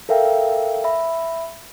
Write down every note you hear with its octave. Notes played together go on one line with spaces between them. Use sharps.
A4 A#4 E5 F5 G5
E5 B5